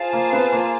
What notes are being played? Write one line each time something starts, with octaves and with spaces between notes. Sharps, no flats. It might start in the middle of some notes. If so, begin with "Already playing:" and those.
Already playing: F4 G#4 C5 F5 A5
A#3
B3
A#3